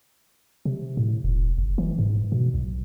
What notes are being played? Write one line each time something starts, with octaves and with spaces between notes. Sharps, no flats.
C3
A2
E1
F#1
E3
G#2
B2
B1